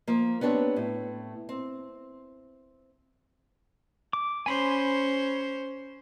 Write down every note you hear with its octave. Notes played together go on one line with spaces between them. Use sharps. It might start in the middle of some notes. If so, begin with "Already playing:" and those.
F3 A#3
B3 C4 D4 G4 C#5
A2
C4
D6
C#4 C5 G#5 B5 C6